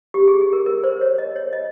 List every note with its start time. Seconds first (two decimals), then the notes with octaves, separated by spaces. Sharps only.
0.14 G4
0.28 G#4
0.41 G#4
0.53 A#4
0.66 A#4
0.84 C5
1.01 C#5
1.18 D#5
1.36 C#5
1.53 D#5